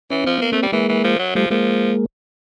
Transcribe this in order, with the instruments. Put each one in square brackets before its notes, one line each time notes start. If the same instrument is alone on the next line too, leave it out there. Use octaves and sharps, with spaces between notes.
[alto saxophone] E3 [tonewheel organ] C#4
[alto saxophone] F3 [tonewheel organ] C4
[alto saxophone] A#3 [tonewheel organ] B3
[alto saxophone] A3 [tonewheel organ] A#3 C4
[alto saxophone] G3
[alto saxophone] E3 [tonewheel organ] G#3 A#3
[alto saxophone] E3
F3
F#3
[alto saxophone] F3 [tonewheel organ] G3 A3
[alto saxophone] F3 [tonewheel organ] G#3 A#3